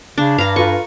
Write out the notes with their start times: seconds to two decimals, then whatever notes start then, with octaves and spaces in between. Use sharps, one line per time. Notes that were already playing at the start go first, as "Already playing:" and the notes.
0.18 C#3 D4
0.38 G2 F5 A#5
0.56 F4 A4 B4 C#6